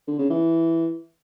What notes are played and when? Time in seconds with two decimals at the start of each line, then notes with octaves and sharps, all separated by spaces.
0.07 D3
0.19 C#3
0.30 E3